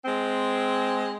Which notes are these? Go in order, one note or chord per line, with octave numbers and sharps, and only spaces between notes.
G#3 C4